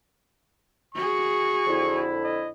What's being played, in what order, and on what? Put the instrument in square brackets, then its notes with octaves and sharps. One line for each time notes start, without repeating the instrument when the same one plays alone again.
[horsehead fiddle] F#4 G#4 [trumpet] C#6
[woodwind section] F2 D3 E4
[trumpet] D#5